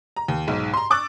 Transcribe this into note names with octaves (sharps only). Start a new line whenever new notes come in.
A#5
D#2
B1 G#2
A#5 C6
C#6 D6 E6 F#6 A6